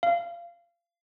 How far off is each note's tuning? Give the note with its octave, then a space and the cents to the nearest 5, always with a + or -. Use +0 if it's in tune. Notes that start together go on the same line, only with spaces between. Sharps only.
F5 -20